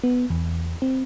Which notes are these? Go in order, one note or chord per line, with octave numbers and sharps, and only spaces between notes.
B3
E2
C4